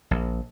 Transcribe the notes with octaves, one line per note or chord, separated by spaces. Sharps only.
A#1